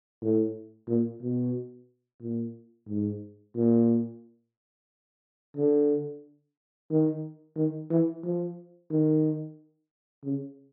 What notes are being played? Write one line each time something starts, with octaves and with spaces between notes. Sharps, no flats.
A2
A#2
B2
A#2
G#2
A#2
D3
D#3
D#3
E3
F3
D#3
C#3